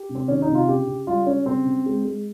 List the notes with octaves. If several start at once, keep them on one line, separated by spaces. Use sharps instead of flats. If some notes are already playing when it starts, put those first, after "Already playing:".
Already playing: G4
C3
C4
D#3 C#4
D#4
C3
F4
C#3 G4
C#3
G3 F4
G3 C#4
C#3 C4
C#3
G#3
G#3